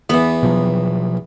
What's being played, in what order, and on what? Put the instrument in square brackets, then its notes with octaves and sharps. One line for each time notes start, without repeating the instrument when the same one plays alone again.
[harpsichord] E2 E3 [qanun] B3
[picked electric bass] B2 F3 F#3